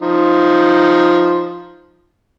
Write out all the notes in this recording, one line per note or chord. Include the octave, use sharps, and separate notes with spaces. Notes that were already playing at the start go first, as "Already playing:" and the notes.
F3 D#4